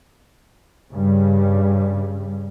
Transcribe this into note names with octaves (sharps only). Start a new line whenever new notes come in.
G2 C#3 G3